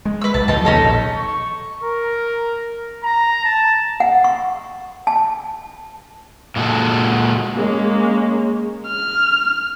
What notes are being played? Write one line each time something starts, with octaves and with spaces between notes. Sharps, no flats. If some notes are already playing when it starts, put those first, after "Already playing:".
G#3
B4 E6
B1 A5
B1 F3 F#3 D#4 A5
D#2 C3 C#4 D#4 A4
A#1
C#6
A#4
A#5
A5
F#5
C#6
A5
A#2 G#3 B3 F#4 A4
G#3 A#3 C#4
F6